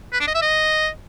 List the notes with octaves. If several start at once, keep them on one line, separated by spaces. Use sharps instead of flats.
B4
D4
D#5
E5
D#5